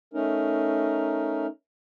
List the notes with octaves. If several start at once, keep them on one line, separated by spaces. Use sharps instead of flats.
A3 C#4 D#4 A#4